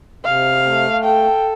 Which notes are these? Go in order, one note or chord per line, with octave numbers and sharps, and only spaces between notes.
C3 F5
A3
A4 G5